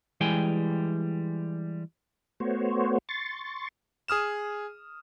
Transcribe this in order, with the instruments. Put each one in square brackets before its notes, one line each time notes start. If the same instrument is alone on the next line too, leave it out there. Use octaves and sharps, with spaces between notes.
[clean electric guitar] E3 G3 G#3 G5 G#5
[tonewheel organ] A3 B3 F#4 C5 C#5
C6 C#6 A6
[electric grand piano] G#4 D#6 F6 E7